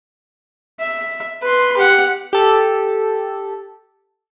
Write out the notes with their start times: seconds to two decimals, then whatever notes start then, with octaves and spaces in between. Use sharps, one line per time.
0.80 E5
1.42 B4 C6
1.76 G4 F#5
2.33 G4 A4